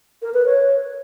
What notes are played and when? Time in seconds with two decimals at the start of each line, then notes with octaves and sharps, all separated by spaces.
0.22 A#4
0.34 B4
0.45 C#5